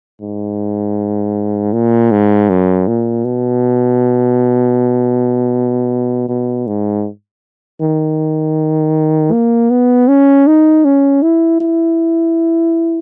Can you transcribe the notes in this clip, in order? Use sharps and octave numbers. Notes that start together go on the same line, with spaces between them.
G#2
A#2
G#2
F#2
A#2
B2
B2
G#2
D#3
A#3
B3
C#4
D#4
C#4
E4
E4